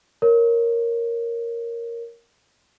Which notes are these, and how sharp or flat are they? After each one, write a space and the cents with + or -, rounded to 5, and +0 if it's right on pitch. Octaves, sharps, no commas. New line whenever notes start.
A#4 +0 C#5 +0